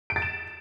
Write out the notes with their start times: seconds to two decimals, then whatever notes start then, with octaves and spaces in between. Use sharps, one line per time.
0.10 D7
0.16 A6
0.22 E7